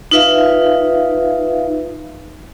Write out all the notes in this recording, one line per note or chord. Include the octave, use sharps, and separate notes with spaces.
D#4 F4 B4 E5 F5